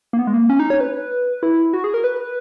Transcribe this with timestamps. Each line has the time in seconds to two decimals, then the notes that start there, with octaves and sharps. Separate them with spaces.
0.13 A#3
0.19 B3
0.27 G#3
0.34 A#3
0.50 C#4
0.60 D#4
0.70 C#5
0.80 B4
1.43 E4
1.73 F#4
1.84 G#4
1.94 A#4
2.04 B4